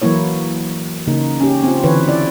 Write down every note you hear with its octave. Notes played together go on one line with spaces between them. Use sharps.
E3 F#3 A#3 E4 C#5
C#3 A#3 D#4
C#4 G4
C4 F4
D3 E3 E4 B4 C#5
E4 D5